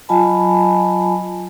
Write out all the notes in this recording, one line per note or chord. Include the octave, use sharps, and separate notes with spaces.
F#3 F4 D#5 G#5 A5 B5